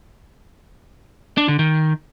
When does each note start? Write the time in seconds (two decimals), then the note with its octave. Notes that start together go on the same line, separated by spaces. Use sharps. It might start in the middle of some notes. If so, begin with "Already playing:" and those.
1.37 D4
1.48 D3
1.59 D#3